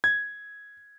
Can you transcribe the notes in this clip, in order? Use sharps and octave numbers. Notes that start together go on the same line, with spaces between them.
G#6